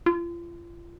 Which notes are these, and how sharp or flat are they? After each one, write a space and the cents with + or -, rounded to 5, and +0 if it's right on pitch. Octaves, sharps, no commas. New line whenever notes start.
F4 -35